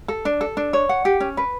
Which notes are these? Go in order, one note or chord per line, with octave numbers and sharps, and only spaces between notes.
A4
D4
A4
D4
C#5
F#5
G4
C#4
B4